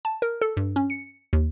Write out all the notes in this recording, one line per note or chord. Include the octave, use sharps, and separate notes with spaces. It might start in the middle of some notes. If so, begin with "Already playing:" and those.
A5
A#4
A4
G2
C#4
C#7
D#2